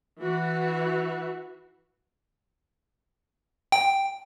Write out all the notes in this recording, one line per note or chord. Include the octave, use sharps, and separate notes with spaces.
E3 F#4
G5